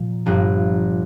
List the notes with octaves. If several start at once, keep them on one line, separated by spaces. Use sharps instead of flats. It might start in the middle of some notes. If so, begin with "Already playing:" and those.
Already playing: A#2 F3
G1 G2 F3 A#3